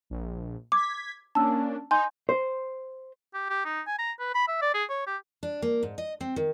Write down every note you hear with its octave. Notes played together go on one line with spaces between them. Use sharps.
A#1
D6 G#6 B6
A#3 C#4 D4 A5 E6
D#4 G#5 C6 G6
C5
G4
G4
D#4
G#5
A#5
B4
B5
E5
D5
G#4
C#5
G4
D4
A#3
G#2
D#5
C4
D#3